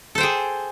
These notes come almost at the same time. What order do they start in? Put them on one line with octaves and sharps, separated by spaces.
A4 C5 G5 G#4